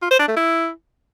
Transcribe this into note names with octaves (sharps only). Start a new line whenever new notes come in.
F4
C5
D4
A3
E4